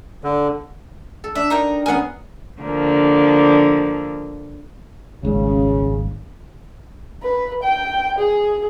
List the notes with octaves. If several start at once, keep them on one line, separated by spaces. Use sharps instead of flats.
D3
A4
D4 E5
D#4 A#4 G5
B3 C#4 G#4 A#4 F#5
D3 F3 A#3
D#1 G#1 G#2 C#3
B4
G5
G#4